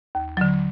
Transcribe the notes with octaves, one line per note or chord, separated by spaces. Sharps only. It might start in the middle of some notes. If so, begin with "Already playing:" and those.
D#2
D3 F#3